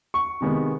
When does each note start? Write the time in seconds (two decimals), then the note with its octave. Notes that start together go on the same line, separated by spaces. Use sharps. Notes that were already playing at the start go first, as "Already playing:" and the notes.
0.14 C#6
0.41 C3 D#3 G#3 B3